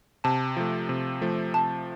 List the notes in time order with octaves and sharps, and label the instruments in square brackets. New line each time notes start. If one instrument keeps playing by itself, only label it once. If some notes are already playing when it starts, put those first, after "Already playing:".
[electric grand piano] C3 [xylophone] A5
[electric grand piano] F3 A3
C3
F3 A3
[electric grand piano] C3 [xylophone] A5